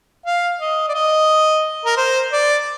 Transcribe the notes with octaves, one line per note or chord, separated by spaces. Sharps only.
F5
D#5
D5
D#5
A#4
C5
D5